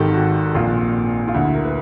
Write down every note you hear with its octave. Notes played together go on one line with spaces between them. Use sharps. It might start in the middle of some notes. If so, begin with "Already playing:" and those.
Already playing: G#1 G#2 D#3 G4 A4
F#4
A#1 A#2 F4
F4
D2 D3 E4
E4
A#4
B4